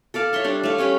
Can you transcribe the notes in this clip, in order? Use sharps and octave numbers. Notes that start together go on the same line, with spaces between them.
A4 D5 F5 A5
C#5 E5 C6 C#6
G3 D4
A3 C#5 F5
G3 C#4 G4 B4